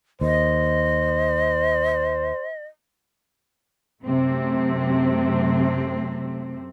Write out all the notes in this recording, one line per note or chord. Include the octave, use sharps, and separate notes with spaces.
D#2 C5 D#5
F#2 C3 A3 C4